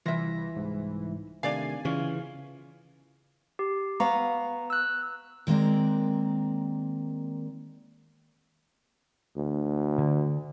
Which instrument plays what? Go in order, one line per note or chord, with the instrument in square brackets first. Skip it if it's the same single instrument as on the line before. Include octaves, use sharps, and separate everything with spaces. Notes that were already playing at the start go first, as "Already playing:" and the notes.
[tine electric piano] C2 A#6 [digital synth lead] E3 [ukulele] F4 E5
[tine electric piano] C2 G#2
[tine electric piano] C3 D#3 A3 [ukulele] D4 D5 F5 [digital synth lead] G#5
[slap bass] C#3 E3 [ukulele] C#4 [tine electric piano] F4 F5
[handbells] G4
[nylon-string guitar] B3 F5 [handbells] A#5 C#6
[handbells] E6 F#6
[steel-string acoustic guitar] D#3 G#3 A#3 C4 D5 A#5
[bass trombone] D2
[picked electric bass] D3